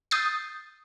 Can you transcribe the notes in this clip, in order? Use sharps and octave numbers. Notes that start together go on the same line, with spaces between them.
D#6 G6 A6 C7